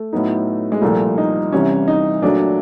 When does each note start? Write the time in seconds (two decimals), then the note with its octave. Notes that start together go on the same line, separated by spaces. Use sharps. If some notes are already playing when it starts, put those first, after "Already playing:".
Already playing: A3
0.13 A2 F#3 B3 D#4
0.72 G#3
0.82 C2 A#2 F3 A3
1.18 D#4
1.52 C2 C3 E3 C#4
1.88 D#4
2.22 A#2 F#3 A3 D4